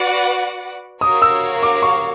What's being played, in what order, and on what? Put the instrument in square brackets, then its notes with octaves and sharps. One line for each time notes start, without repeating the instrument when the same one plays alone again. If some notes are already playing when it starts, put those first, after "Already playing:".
Already playing: [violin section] F#4 B4 D5 F#5
[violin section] F#4 A#4 C#5 F5 [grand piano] D#6
[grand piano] E6
D6
C#6